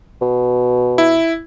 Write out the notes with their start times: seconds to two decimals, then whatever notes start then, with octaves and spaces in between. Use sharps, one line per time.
0.21 B2
0.98 E4